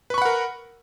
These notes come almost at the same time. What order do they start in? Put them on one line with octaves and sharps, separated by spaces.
B4 C#6 B5 F#5 A#4